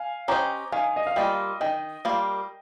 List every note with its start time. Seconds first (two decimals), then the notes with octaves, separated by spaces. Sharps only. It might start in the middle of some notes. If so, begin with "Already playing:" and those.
Already playing: F5 G#5
0.28 C#4 G4 C5 D#5 G5 A#5
0.72 D#3 F5 G#5
0.96 D#5
1.07 F5
1.16 G3 A#3 F4 D#5 G5
1.61 D#3 D#5 G5
2.05 G3 A#3 F4